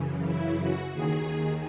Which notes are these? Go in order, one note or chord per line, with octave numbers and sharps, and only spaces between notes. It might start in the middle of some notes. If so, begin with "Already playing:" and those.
Already playing: F#2 C#3 E3
E4
F#4
D#2 D#3 G#4